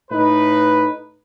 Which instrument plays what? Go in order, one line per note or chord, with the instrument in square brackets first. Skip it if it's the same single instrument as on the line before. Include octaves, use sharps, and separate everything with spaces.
[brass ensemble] A2 D#4 B4